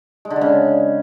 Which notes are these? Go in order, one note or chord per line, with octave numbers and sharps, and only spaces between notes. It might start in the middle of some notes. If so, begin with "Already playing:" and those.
G#3
D3
G#3
C#3